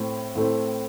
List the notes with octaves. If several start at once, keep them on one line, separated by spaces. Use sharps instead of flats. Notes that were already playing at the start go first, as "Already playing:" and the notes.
Already playing: A2 A3 C4
A2 A3 C4